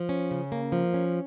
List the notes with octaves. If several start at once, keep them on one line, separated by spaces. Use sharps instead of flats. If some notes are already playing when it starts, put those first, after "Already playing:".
Already playing: F3
C#4
C#3
A#3
F3
C#4